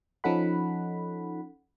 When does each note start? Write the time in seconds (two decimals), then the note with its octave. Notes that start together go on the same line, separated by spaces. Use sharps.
0.24 F3 C#4 D#4 A4 F#5 B5